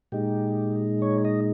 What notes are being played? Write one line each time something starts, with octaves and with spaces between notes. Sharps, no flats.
A#2 G#3 D#4 G4
C#5
D#5